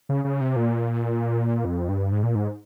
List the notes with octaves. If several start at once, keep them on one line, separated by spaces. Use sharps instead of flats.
C#3
C#3
C3
A#2
F2
G2
G#2
A#2
G#2